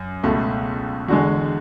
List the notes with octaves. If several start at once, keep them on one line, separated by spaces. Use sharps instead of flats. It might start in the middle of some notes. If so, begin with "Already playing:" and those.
Already playing: F#2
C#2 B2 A3
E2 D3 G#3 F#4